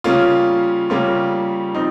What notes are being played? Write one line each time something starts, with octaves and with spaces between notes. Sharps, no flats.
C#3 G3 A#3 C#4 F4
C#3 G3 A#3 C#4 F4
F3 C4 D#4